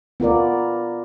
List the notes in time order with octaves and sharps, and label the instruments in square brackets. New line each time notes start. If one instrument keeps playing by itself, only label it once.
[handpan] B3 F4 A#4 D5